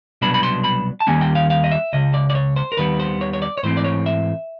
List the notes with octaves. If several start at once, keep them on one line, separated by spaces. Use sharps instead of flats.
C2 B2 F#3 B3 D4 B5
B5
C6
B5
A5
D#2 D#3 G3 A#3 C#4 G#5
G5
F5
F5
D#5
E5
C#2 C#3 D#5
D5
D5
C#5
C5
A#4
D#2 D#3 G3 B3 B4
C5
C#5
C#5
D5
C#5
G#2 E3 A3 C4 C5
D5
C#5
E5